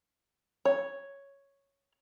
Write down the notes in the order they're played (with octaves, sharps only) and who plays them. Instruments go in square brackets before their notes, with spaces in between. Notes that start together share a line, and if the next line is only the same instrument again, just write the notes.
[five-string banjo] C#5